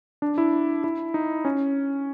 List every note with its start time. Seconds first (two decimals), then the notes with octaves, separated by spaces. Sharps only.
0.22 D4
0.38 E4
0.84 E4
1.14 D#4
1.45 C#4